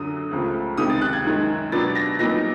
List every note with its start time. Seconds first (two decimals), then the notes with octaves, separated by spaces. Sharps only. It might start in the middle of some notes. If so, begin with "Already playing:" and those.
Already playing: F#2 D3 F#3 D#6
0.31 C#2 C#3 F3 A3
0.77 C#2 C3 D#3 G#3 D#6
0.90 A6
1.01 F#6
1.13 G#6
1.25 F#2 D#3 G#3
1.72 B2 F#3 B3 D4 A6
1.95 A#6
2.19 C2 A#2 F#3 B3 D#4 A#6